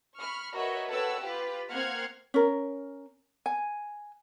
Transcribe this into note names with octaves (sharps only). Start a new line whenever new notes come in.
B5 C#6 F6
F#4 A#4 B4 C#5 D#5 E5
A4 B4 C#5 F#5 G5 E6
F4 G4 B4
A#3 C4 F#5 F6 G#6 C7
C#4 A#4
G#5